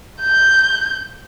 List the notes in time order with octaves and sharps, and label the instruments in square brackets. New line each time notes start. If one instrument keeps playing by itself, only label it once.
[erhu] G6